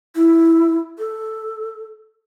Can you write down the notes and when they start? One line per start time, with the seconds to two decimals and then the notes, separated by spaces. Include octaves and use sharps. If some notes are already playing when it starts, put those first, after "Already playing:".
0.15 E4
0.98 A4